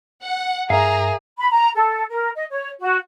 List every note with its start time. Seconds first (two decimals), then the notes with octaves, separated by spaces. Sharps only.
0.23 F#5
0.70 G2 G#4 A#4 E5 F5 A#5
1.38 B5
1.51 A#5
1.75 A4
2.10 A#4
2.35 D#5
2.50 C#5
2.80 F#4